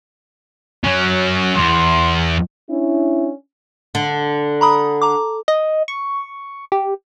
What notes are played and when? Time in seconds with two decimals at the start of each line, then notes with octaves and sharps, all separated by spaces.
0.84 F#3 C#4 C#5
1.56 E2 C6
2.70 C#4 D4 E4
3.95 D3
4.61 A#5 B5 D#6
5.02 A#5 D6
5.48 D#5
5.88 C#6
6.72 G4